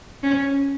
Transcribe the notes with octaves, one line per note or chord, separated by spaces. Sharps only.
C#4